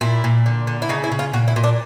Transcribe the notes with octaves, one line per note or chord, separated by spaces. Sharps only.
A#2 E4
A#2
D3
D3
E4
C#3 D#4
E4
C#3
F4
A#2 F#4
E4
A#2
D4